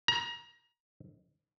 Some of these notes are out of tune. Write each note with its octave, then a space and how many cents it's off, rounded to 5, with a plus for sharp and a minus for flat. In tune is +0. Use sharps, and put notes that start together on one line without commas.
A#5 +30